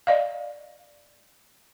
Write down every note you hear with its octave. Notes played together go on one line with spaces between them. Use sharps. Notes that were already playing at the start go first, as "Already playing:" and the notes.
D5 D#5 F5